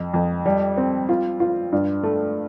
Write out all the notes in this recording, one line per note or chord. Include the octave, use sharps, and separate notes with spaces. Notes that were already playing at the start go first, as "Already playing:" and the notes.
Already playing: F2
F2
G3
C4
F4
F4
G2
A3